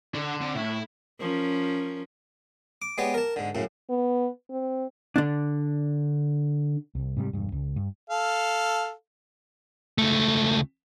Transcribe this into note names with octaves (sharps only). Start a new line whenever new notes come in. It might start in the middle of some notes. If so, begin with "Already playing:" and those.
D3 D4 A4
C4 D5
A2 E4
F3 C#4 A#4
D6
G#3 B3 G4 C#5 D5
A#4 A5
G#2 D3
F#2 A2 C#3
B3
C4
D3 D4
C2
G#2 C3 F#3 G3
E1 G2
C#2
G2
A4 F5
C#2 A3